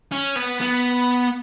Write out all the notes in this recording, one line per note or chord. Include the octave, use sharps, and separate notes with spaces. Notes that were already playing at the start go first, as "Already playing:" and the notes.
C#4
B3
B3